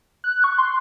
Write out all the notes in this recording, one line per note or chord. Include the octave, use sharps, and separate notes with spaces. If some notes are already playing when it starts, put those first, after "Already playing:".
F#6
C#6
C6